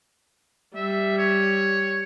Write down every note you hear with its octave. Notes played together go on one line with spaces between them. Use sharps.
G3 E5
C#5